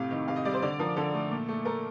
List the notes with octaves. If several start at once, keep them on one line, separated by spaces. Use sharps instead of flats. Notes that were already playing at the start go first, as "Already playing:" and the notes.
Already playing: A2 C3 F5
D#3
C3 F5
D#5
G3 D5
C5
D3 D5
F3 A#4
D3 A4
A3
A#2
A3
A3 A#4